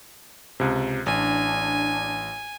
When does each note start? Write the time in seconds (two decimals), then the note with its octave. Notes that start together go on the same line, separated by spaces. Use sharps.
0.60 C#2 C3
1.06 A1 D4 G#5